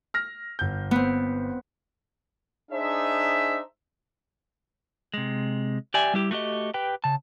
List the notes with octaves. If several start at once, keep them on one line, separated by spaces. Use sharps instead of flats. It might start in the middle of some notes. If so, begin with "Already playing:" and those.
F6 A#6
G1 G6
B3 C4
D4 D#4 G#4 C5 E5
C3 G#3
G4 D5 E5 G#5
G3 E4 G4
A3 F#4 G4 D#5
G4 B4 G5
C#3 A5